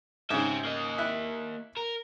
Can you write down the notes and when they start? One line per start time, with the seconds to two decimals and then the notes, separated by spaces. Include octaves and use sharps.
0.30 G#2 C#3 G4 E5
0.65 A#3 D#5
0.98 E4 F#6
1.77 A#4